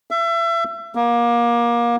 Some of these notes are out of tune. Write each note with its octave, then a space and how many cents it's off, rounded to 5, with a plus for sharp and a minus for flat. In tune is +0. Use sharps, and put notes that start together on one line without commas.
E5 +30
A#3 +25